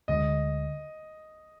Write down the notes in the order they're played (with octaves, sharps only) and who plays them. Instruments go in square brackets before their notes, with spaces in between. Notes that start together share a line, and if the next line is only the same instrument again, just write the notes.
[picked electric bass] D2 D3 G#3 [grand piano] D#5